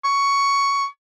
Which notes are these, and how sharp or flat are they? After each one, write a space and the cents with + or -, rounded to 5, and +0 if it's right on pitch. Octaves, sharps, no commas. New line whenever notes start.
C#6 +10